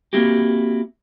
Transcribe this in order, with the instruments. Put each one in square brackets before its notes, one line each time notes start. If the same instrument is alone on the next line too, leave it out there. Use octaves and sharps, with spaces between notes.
[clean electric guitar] A#3 C4 E4 F#4 G4